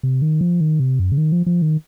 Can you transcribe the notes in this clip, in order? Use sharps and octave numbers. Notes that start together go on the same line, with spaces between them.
C3
D#3
F3
D#3
C3
F#2
C#3
D#3
F3
F3
D#3